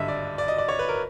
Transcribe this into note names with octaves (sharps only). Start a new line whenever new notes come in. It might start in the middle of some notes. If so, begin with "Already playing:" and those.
Already playing: G#1 G2 D3 D#5 E5
D5
D5
D#5
D5
C#5
B4
A#4